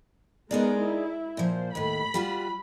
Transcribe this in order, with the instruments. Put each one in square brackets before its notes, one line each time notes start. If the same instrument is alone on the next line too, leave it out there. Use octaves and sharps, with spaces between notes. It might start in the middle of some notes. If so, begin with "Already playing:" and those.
[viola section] G#3 B3 A#4 [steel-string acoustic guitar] D#4 G#4 D5
[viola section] E4
[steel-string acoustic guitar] A#2 F3 [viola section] C5
[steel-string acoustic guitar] D#2 A2 [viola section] B5
[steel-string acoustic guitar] G3 F4 F#4